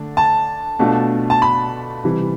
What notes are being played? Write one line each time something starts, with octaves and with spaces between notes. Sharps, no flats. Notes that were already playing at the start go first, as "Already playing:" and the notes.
Already playing: D3 A3 D4
A5
B2 A3 D4 F4
A5
B5
C3 E3 G3